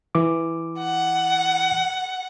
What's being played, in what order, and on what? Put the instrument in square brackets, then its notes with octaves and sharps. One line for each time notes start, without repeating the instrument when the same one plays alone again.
[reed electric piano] E3 D6
[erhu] F#5